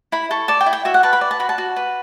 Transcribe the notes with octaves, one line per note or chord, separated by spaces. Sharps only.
E4 B5
A4 C#6
D5 A5
G5
E4
G5
F#4 E5
F#5
B4 A5
B5
D5
A5
F#4 B5
A5
F#4
B4